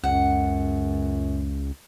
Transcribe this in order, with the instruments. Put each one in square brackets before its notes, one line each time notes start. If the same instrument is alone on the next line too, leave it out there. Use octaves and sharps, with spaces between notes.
[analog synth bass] C#2 [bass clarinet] F#2 [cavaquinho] F#5